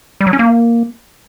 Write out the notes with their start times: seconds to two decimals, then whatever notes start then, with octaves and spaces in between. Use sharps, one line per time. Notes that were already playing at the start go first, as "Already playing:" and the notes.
0.21 G3
0.27 F#3
0.33 C#4
0.39 A#3